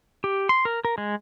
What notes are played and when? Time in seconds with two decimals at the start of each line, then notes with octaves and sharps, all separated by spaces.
0.24 G4
0.49 C6
0.65 A#4
0.85 A#4
0.98 G#3